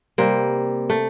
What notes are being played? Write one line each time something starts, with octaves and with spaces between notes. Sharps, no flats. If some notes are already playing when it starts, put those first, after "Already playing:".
C3 G3 A#3
A3